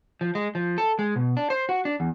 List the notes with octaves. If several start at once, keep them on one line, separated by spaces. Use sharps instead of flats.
F3
G#3
F3
A4
G#3
B2
D4
C5
F#4
D4
E2